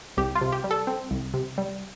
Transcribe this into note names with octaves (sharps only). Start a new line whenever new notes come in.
C2 G4
F4
C3
G4
G3
A4
C4
C2
C3
G3